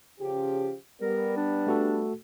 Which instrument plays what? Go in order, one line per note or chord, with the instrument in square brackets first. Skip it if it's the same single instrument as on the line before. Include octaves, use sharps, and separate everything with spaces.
[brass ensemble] C#3 F3 G4
[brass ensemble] G3 B3 [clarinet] A#4
[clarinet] D4
[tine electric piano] A3 F#4 A4